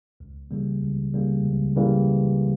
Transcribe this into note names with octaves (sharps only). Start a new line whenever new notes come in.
C#2
C#3 E3 G3 A#3
C#2
C#3 E3 G3 A#3
C#2
C#3 E3 G3 A#3